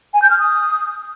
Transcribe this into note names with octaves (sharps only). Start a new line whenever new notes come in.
G#5
G6
F6
D#6